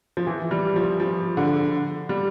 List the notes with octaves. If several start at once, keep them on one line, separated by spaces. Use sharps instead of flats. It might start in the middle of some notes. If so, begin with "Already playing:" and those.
F3
E3
G3
F3
F3
D3
G3